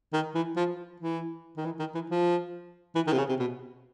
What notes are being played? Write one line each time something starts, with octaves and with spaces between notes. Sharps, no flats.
D#3
E3
F3
E3
D#3
E3
D#3
E3
F3
E3
D#3
C3
C#3
C3
B2